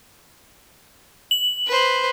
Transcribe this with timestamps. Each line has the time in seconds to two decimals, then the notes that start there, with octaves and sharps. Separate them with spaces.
1.31 F#7
1.67 B4 C5